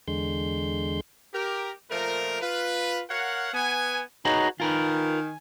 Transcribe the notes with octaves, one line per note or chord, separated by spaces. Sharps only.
E2 D3 G#3 C6 G6
G4 A#4
A#2 F3 A3 A#4
F4 B4
A#4 C#5 F5 F#5
B3 G#5
D#4 F#4 G#4 B4 C#5 A#5
D#3 F4 A#4 B4 G#5